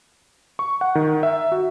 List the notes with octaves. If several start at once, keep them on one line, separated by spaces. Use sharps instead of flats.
C#6
F#5
D#3
E5
F#4